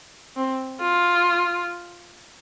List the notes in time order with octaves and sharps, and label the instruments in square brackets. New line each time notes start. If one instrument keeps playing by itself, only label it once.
[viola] C4
F4